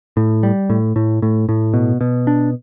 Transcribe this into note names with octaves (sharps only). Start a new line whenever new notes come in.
A2
G3
A2
A2
A2
A2
B2
B2
D4